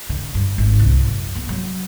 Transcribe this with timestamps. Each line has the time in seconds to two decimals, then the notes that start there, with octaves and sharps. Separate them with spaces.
0.09 D3
0.35 G2
0.58 G#1
0.80 C2
1.00 F#2
1.35 B3
1.49 F#3